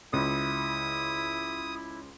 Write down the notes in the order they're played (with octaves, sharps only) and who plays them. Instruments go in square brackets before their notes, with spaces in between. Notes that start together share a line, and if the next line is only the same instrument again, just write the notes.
[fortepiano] C#2 [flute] E4 [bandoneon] D#6